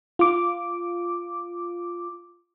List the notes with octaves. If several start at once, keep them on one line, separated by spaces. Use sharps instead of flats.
F4 D6